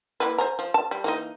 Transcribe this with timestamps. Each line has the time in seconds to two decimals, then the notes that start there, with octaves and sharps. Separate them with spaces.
0.20 A#3 E4 B4
0.38 C5 G#5 A#5
0.59 F3
0.74 A5
0.91 G3
1.04 E3 A#3 D#4